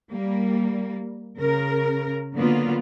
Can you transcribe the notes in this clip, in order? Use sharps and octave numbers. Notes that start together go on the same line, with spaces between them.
G3 A#3
C#3 A#4
D3 F#3 A#3 B3 F4